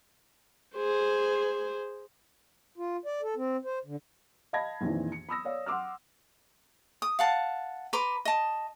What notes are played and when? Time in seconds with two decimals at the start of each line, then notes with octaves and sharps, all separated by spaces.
0.76 G#4 C5
2.78 F4
3.05 D5
3.22 A4
3.36 C4
3.65 C5
3.85 D3
4.53 D#5 F5 A5 B5 G#6 A#6
4.81 A#1 F2 D#3 E3
5.12 C#7
5.29 B5 D#6 E6 A#6
5.45 C#5 D5 F5
5.66 F#5 C6 D6 E6 F6
7.02 D#6
7.19 F5 F#5 A5
7.93 B4 A#5 C6 D6
8.25 D#5 A5